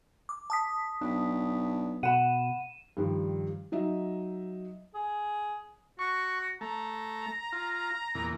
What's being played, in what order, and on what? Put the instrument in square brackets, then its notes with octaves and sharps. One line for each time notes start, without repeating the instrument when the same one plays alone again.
[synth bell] D6
A5 D#6 B6
[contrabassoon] B1 [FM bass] D4
[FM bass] B2 [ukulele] F#5 B5 [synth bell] D#7 E7
[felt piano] G2 D#3 F3 G3
F#3 D#4 D#5 E5
[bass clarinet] G#4
[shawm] F#4 [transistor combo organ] C#6
[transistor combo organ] A3 [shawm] A#5
[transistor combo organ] F4
E2 A#2